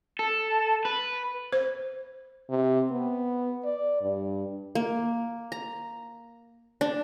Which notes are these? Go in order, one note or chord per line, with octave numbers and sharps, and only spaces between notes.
A4
B4
C5
C3
B3
D5
G2
A#3
A#5
D4